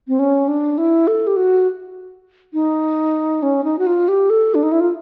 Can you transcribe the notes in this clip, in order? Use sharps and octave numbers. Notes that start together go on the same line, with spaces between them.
C4
C#4
D4
E4
A4
G4
F#4
D#4
C#4
D#4
F#4
F4
G4
A4
D4
D#4
E4
F4